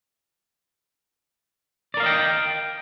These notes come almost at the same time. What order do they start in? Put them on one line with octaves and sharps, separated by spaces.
D5 A#4 F5 D#5 G5